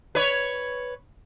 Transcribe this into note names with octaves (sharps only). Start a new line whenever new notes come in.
B4 C#5